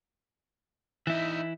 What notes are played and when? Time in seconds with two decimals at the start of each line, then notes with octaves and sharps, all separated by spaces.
1.07 E3 D#4 E4 E5